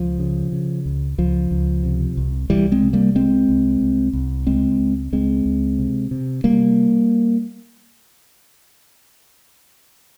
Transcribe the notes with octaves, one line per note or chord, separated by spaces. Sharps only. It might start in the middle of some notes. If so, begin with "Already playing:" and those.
Already playing: C#2 F3
C#3
C#3
C#2
C#2 F3
C#2
C3
C2
C2 E3 G3
G#3 C4
C3
G3 A#3
C2 G#3 C4
C2
C2
C2
C#2 G#3 C4
C#2
C#2 G#3 C4
C#2
C3
C3
C3 G3 A#3